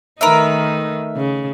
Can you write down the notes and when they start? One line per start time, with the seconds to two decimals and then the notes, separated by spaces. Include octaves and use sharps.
0.21 D#3 A3 D#4 A#4 B4 E5
1.16 C#3